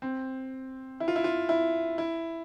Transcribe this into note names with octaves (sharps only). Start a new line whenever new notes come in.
C4
E4
F4
E4
F4
E4
E4